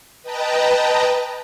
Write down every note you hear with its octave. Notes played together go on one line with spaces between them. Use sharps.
B4 D#5 G5 A5 A#5